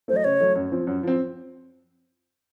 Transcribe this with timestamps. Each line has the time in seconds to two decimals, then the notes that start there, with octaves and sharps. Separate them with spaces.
0.08 A3 C5
0.13 F#3 D#5
0.24 C#3 C#5
0.40 F#3 A3
0.55 F#2
0.72 F3 C4
0.87 F#2
1.03 F3 C4